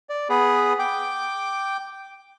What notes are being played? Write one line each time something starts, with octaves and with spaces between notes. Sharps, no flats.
D5
B3 G#4 B4
G5 D6